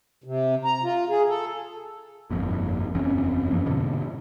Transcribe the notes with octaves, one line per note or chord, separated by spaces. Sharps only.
C3
A#5
F4
G#4
A4
G1 F2 A#2
F#1 E2 C4 C#4
F#2 F3 A#3
G#2 B2 D3